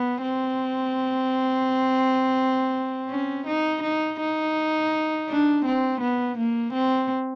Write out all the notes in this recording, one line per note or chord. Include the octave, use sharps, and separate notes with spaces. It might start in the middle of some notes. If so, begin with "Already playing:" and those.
Already playing: B3
C4
C#4
D#4
D#4
D#4
D4
C4
B3
A#3
C4